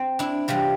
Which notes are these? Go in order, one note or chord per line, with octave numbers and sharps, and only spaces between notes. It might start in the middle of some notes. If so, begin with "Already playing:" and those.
Already playing: C4
D4 E4
C3 E3 G3 F4 G4